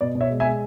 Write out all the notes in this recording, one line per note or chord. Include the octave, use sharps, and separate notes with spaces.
B2 D5
B2
C#5 E5
G#3
E5 G#5
G#3